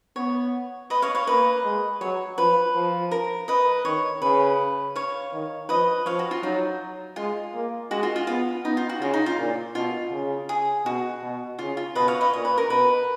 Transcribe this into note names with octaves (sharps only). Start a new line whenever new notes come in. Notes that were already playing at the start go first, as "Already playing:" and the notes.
B3 C#5
B4 D#5
C#5 F5
C#5 F5
A#3 B4 D#5
G#3
F#3 C#5
F3 B4
F3
A#4
B4 D#5
D#3 C#5
C#3 B4
C#5 F5
D#3
F3 B4 D#5
F3 C#5 F5
F#4
F4
F#3 D#4
G#3 F4
A#3
G#3 F#4
F4
F4
B3 F4
B3 D#4
F4
F#4
C#3 F4
D#4
F4
A#2
B2 F4
C#3
G#4
B2 F#4
B2
C#3 F4
F4
B2 B4 D#5
C#5 F5
B4 D#5
A#2 C#5
B4
A#4
B2 B4